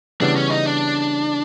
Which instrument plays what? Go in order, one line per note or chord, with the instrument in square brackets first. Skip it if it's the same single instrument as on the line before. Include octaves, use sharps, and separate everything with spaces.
[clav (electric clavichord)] C#3 E3 G3 B3 [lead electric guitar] D4
[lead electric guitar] C#4
D#4
D4